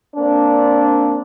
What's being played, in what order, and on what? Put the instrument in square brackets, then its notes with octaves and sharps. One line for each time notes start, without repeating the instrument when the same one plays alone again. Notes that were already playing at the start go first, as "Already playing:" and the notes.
[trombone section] A#3 C4 D4